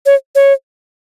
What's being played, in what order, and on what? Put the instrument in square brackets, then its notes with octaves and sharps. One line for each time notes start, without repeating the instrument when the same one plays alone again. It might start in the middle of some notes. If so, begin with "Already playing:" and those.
[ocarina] C#5
C#5